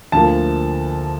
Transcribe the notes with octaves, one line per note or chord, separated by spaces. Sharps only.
D2 D3 F3 A#3 A5